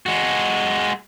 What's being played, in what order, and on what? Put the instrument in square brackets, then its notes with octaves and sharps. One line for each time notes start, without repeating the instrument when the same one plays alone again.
[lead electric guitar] G#3 F#4